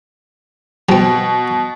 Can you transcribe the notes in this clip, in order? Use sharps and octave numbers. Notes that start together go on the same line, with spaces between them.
B2 F#3 C4